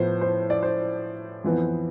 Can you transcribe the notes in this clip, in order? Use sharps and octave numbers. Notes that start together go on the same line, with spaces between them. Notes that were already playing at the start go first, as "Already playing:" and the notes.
Already playing: A2 F3 B3 C5
C5
D5
C5
F2 E3 B3